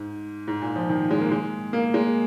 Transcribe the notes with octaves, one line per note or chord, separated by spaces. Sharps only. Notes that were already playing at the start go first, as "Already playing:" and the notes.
Already playing: G#2
G#2
A#2
F3
D#3
G#3
A#3
G#3
A#3
G#3